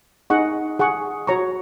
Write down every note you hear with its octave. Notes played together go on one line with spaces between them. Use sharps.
D#4 G#4 D#5 F#5 C#6
G#4 F#5 C#6
F#4 C#5 A#5 C#6